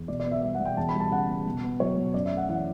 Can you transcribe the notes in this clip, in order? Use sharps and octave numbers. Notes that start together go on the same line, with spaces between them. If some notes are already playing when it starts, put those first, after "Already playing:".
Already playing: E2
B2 D5
D5
B3
E5
G3 E5
F#5
B2
G5
E2 A5
B5
G3
A5
C#3 F#5
B3
B2
B3
F#3 C#5
B2
F#2 D5
E5
A3
F#5
E3 F#5